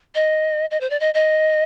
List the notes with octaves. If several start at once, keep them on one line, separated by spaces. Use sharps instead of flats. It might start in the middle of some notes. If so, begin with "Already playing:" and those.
D#5
D#5
C5
D5
D#5
D#5